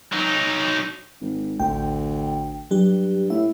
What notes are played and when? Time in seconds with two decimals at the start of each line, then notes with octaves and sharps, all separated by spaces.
0.12 F#3 D#4
1.21 G#1
1.60 A1 D2 G5
2.71 G2 F#3 G4
3.30 A2 E5